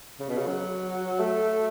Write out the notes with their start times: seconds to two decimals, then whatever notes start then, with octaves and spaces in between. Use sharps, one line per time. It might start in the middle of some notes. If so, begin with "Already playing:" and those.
0.20 C#3
0.29 B2
0.38 C#3
0.47 F#3
1.20 A3